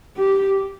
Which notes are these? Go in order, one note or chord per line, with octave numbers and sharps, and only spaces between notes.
G4